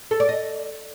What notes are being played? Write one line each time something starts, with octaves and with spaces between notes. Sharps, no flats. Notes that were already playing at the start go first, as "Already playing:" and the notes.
A4
D5
D#5